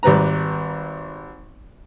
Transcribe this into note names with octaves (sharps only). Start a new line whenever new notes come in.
G#1 G3 B4 A#5